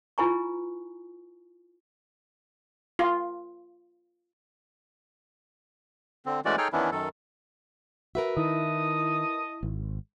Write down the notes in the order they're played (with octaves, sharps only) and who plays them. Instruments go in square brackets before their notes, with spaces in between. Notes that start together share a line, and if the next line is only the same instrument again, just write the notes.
[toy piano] E4 F4 B4 G#5 A#5 C#6
[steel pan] F4
[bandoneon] D3 C4
E3 G#3 A3 C#4 F#4 D5
D#4 G#4 A4 C#5 G5 F6
D#3 E3 B3 C#4 D4 E4
F#2 D#3 A4
[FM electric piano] F#4 [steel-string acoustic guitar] A#4 B4 E5
[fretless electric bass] D#3 [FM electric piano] E4 [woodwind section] D#5 A5 D#6
[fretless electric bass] G#1